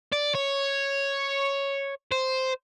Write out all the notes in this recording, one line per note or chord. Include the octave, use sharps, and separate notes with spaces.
D5
C#5
C5